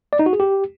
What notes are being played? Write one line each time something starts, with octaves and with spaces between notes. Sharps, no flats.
D5
D#4
F#4
G#4
G4